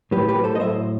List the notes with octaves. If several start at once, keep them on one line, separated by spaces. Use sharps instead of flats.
A2 F#3 G4 B4
G4 B4
A4 C5
D#5
A2 F#3 C5 E5